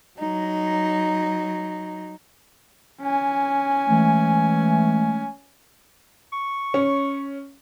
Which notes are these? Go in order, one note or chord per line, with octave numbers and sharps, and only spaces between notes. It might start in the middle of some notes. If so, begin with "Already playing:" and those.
F#3 D#4
C#4 G#5
E3 G#3 A3
C#6
C#4